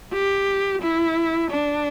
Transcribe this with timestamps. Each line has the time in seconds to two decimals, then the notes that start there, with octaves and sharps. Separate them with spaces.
0.14 G4
0.82 E4
1.51 D4